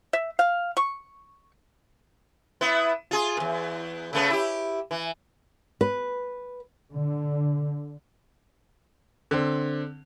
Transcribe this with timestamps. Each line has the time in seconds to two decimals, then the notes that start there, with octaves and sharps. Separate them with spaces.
0.13 E5
0.39 F5
0.77 C#6
2.61 B3 E4
3.11 F4 G#4
3.37 E2 A#2
4.13 C#3 A3 B3
4.30 E4 G4
4.91 E3
5.81 B4
6.93 D3
9.31 D3 C4